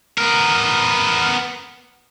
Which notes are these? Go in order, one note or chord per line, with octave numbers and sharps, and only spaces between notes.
B3 A#4